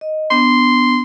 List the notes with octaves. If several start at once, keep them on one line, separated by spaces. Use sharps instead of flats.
D#5
B3 D4 C6